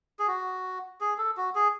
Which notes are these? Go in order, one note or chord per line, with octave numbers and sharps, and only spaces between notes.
G#4
F#4
G#4
A4
F#4
G#4